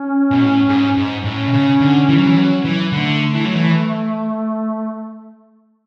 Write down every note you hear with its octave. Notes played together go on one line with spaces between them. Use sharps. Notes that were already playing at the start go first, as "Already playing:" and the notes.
Already playing: C#4
B2
A2
G#2
G#2
A2 C#4
B2
C#3
D3
E3
F#3
E3
F#3
E3
D3 A3
E3
F#3
E3